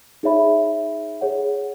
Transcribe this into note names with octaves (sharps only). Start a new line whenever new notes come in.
D#4 G#4 C#5 E5 B5
G#4 C#5 F#5